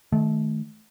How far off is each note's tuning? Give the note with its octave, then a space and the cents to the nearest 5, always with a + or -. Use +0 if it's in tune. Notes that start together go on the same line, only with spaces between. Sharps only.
D#3 +0 A3 -25